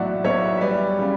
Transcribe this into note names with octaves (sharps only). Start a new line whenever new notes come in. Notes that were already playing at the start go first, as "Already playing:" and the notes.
Already playing: B1 A2 F#3 D5 E5 F#5
B1 C#5 E5
E5
G3 B4 D5
C#3